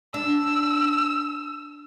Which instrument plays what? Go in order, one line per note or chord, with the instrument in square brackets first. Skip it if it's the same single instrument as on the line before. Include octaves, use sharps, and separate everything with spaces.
[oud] D4 [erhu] E6